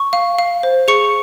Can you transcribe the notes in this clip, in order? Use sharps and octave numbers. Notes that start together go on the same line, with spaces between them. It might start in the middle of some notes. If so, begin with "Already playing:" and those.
Already playing: C#6
F5
F5
C5
G#4 C#6 C#7